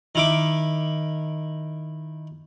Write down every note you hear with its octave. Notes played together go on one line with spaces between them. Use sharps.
D#3 E4 D6